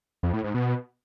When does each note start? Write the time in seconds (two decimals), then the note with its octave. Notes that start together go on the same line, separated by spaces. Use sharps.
0.23 F2
0.33 A2
0.44 G#2
0.54 B2